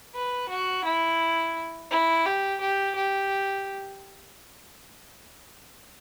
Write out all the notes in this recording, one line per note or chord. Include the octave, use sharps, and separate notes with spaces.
B4
F#4
E4
E4
G4
G4
G4